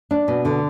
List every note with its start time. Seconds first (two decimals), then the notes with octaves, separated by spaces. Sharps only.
0.11 D4
0.28 B2
0.45 D3